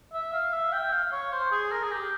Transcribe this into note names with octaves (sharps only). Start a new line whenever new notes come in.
E5
F5
E5
G5
F5
C#5
C5
G#4
A#4
G#4
G4